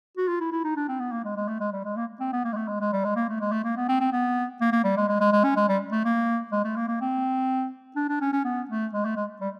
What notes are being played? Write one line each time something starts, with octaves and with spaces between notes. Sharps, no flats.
F#4
F4
E4
E4
D#4
D4
C4
B3
A#3
G#3
G#3
A3
G#3
G3
G#3
A#3
C4
B3
A#3
G#3
A3
G#3
G#3
G3
G#3
A#3
A3
G#3
A3
A#3
B3
C4
C4
B3
A#3
A#3
G3
G#3
G#3
G#3
G#3
C#4
G#3
G3
A3
A#3
G#3
A3
A#3
A#3
C4
D4
D4
C#4
C#4
B3
A3
G#3
A3
G#3
G3